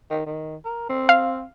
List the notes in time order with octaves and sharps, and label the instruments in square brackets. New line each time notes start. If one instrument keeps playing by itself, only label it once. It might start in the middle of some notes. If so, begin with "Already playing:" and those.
[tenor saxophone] D#3
D#3
A#4
C4
[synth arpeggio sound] F5